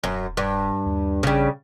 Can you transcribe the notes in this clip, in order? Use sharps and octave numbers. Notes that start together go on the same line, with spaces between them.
D#1 F#2
G2
D#2
A1 C#3 G3